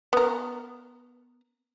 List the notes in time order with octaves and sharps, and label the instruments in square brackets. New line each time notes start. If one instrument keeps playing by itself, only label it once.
[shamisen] B3 A#4